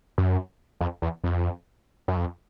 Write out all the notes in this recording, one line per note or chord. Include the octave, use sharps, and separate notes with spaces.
F#2
F2
E2
F2
F#2
F2